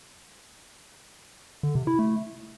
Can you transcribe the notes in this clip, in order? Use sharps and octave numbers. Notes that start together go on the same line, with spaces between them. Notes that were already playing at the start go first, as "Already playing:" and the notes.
D3
C3
E4
A3